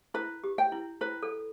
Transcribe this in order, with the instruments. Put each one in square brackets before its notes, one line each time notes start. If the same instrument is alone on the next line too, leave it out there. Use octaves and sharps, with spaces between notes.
[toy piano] E4 [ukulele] B4
[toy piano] G4
[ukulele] G5
[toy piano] E4
[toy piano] E4 [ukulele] B4
[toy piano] A4